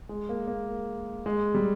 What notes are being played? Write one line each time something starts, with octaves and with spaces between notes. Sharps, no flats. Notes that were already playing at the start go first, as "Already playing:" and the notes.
G#3
A#3
A#3
G#3
G3